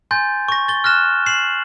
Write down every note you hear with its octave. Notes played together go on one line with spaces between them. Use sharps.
G#5 C6 G6 A6
C#6 A#6
A6 G7
F6 F#6 A#6 E7
C7 E7 F#7